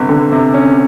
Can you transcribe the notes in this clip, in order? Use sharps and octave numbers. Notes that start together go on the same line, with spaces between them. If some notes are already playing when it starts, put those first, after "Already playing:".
Already playing: G1 C3
D3
C3
C#4